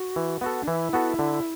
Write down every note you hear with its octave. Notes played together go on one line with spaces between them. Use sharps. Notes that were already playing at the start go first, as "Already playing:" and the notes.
Already playing: F#4
E3
B3 F#4 A4
D4
E3 E4
B3 F#4 A4
D3